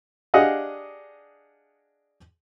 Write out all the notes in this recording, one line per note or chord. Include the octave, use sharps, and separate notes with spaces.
D4 G4 G#4 D#5 F5 F#5